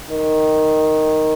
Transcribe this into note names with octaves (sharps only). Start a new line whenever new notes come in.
D#3